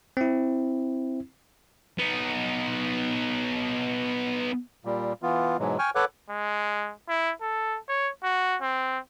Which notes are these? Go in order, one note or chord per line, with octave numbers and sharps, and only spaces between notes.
C4 E4
B3 D#4
A#2 G3
E3 B3 F4
G#2 B2 E3 F#3 G#3
G5 G#5 C#6 F6
A4 B4 C#5 F#5 D6 F#6
G#3
E4
A4
C#5
F#4
C4